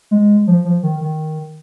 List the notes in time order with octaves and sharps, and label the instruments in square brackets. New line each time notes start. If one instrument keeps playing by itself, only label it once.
[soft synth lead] G#3
F3
F3
D#3
D#3